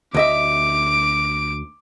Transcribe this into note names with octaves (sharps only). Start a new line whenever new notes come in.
D2 D#5 E5 D6 D7